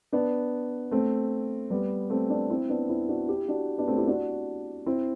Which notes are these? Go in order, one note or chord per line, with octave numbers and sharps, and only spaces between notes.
B3 D4
A3 C4
G3 B3
A3 C4
B3 D4
C4 E4
B3 D4
C4 E4
D4 F#4
E4 G4
D4 F#4
B3 D4
A3 C4
E4 G4
D4 F#4
C4 E4